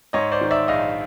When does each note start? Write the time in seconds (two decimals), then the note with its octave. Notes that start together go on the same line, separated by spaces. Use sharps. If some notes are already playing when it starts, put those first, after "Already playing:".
0.13 G#2 C#5 D#5
0.32 C5 D5
0.41 D#3
0.51 D5 E5
0.68 A#1 D#5 F5